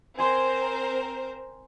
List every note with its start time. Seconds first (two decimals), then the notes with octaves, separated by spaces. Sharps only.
0.18 C4 A#4 C5 G#5 C6